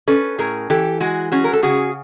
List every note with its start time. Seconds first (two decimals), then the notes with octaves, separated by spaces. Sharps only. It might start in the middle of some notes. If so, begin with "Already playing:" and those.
0.08 C#4 A4 B4
0.38 A2 G#4 A#4
0.70 E3 G4 A4
1.00 G#3 F#4 G#4
1.32 C#4 F#4 G#4
1.44 A#4
1.53 A4
1.62 C#3 F#4 G#4